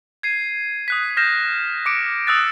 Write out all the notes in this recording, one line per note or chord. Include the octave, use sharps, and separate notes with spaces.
G#6 C7 D#7
D#6 F#6 B6
F6 G6 A#6 C7 E7
D6 C#7 D7
D#6 E6 F#6 A6